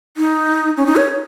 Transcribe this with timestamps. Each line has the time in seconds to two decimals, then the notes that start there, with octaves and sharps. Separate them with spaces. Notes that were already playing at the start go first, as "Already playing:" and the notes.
0.17 D#4
0.77 C#4
0.86 D#4
0.96 C#5